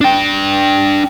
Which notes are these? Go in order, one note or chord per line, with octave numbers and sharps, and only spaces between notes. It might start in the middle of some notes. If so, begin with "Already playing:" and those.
D4 G5